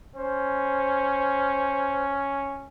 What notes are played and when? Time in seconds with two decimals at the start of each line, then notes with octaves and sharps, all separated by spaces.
0.16 C#4 C5